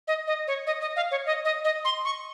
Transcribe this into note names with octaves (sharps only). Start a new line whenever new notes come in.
D#5
D#5
C#5
D#5
D#5
F5
C#5
D#5
D#5
D#5
C6
C#6